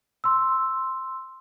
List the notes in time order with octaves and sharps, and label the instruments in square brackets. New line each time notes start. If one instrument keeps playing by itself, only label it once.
[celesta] C6 E6